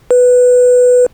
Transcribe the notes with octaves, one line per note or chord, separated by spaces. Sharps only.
B4